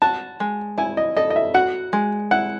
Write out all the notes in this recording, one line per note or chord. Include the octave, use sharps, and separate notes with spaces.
F#4 A5
G#3
E4 G#5
D#5
A4 D#5
D#5
E5
F#4 F#5
G#3
E4 F#5